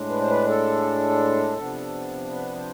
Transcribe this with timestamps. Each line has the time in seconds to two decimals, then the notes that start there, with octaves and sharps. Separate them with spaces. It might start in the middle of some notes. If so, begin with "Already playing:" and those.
Already playing: A2 G#3 D4
0.10 B4
0.20 C5
0.30 B4
0.48 A4
1.58 C3 F3 B3 D4
2.32 B4
2.57 C5